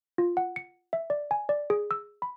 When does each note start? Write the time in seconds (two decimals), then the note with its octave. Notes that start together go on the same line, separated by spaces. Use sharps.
0.18 F4
0.37 F#5
0.56 C#7
0.93 E5
1.10 D5
1.31 G#5
1.49 D5
1.70 G#4
1.91 E6
2.22 B5